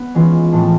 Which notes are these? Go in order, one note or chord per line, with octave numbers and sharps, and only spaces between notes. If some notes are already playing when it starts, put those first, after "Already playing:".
Already playing: B3
E3 G#3 C#4 F4
A2 F3 A3 C4